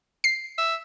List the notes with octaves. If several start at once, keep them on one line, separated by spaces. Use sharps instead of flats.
C7
E5